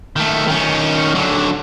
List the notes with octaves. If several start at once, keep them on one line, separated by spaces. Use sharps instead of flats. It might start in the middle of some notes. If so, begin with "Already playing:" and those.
D#3 A3
D#3 C#4
D3 F#3